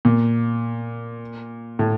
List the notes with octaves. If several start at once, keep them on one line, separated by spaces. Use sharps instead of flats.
A#2
A2